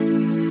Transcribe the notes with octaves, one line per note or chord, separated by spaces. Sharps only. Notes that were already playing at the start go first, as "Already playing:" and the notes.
Already playing: E3 A3 C#4 E4
B5